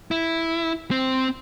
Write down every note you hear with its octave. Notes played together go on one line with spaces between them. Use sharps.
E4
C4